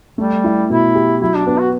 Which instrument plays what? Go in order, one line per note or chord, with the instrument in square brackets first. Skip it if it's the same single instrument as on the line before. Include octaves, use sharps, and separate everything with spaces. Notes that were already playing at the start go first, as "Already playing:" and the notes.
[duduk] G3 [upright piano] A3
[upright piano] E4
[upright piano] B2 [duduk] E4
[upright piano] G4
[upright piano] F#3 [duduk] E4
[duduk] D4
[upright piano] B3 [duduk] D4
[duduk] F#4